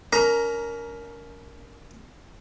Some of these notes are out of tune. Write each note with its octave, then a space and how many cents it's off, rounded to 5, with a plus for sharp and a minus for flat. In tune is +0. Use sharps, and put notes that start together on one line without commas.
C#4 +40 A#4 +0 A#5 +10